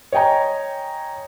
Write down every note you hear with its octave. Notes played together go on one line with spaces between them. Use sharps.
C#5 D#5 G5 G#5 A#5